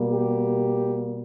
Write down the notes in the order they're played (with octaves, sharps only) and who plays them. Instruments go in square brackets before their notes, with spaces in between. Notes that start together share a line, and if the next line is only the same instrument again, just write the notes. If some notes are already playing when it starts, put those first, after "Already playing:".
Already playing: [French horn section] B2 G3 A#3
G4